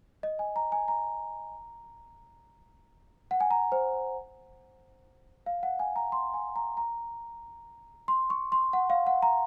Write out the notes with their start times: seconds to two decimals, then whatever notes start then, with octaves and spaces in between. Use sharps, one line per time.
0.23 D#5
0.39 G#5
0.56 A#5
0.72 G#5
0.88 A#5
3.31 F#5
3.40 G#5
3.51 A#5
3.72 C5
5.46 F5
5.63 F#5
5.79 G#5
5.96 A#5
6.12 C6
6.34 G#5
6.56 A#5
6.77 A#5
8.08 C6
8.30 C#6
8.52 C6
8.73 F#5
8.90 F5
9.07 F#5
9.22 A#5